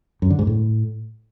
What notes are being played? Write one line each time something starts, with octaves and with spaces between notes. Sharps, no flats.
F#2
D3
G#2
A2